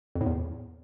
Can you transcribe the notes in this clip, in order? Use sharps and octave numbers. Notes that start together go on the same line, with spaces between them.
F2
A2
E2